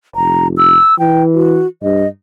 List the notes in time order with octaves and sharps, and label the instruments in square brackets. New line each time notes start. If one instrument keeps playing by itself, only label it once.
[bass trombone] F1 [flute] A#5
[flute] E6
[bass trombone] E3 [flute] G5
[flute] F#4
[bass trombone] G2 [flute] D#5